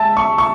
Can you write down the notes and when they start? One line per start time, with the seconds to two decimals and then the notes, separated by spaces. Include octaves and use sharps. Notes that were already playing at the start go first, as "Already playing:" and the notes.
Already playing: G#3 E5 A5
0.17 C#6
0.38 C#6